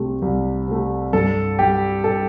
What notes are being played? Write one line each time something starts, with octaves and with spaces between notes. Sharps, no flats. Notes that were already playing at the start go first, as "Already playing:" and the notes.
Already playing: C2 C3 A3
C2
C3 A3
G2 A4
G3 G4
A4